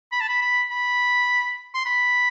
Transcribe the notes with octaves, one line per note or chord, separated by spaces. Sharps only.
B5
A5
B5
B5
B5
C6
B5